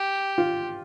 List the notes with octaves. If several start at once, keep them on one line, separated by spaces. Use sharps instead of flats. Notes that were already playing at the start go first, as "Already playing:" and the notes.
Already playing: G4
F4